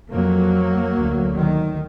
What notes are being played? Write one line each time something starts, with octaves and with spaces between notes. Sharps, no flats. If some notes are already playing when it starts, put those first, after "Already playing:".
F2 F#3 A#3
D2
D#3